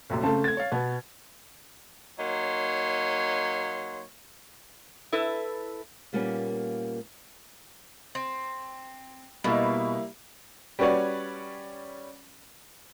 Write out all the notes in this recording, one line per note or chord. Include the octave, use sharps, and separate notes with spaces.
F1 A#1 F#2
C#3 A3 C4 A5
G#6 A6
C#5 F5
B2 B3
F#3 A#3 D#4 C#5 C6
E4 A4 B4
A#2 G3 A#3 B3 C#4
C4
B2 G3 A#3 E4
G3 C#4 F#4 B4 C#5 D5